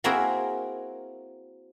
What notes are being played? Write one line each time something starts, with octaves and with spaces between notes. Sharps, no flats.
A#3 C4 E4 F#4 G#4 A#4